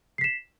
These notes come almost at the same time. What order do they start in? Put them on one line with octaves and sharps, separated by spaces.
C7 B6 E7